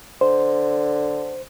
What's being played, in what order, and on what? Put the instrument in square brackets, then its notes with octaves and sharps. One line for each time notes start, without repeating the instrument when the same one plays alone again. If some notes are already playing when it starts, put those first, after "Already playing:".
[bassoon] D3 [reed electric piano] C5